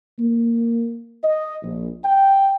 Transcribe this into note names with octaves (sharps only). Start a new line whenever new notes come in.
A#3
D#5
A#1
G5